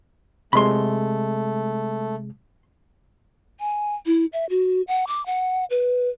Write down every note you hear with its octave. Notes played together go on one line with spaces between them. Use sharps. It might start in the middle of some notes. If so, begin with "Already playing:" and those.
C3 G#3 A3 B5 C6
G#5
E4
E5
F#4
F#5
D6
F#5
B4